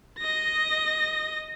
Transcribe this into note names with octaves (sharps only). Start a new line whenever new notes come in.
D#5 A#6